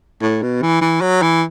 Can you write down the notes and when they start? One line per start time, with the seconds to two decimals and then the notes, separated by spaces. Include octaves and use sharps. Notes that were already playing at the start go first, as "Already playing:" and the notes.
0.22 A2
0.42 B2
0.62 E3
0.81 E3
1.01 F#3
1.22 E3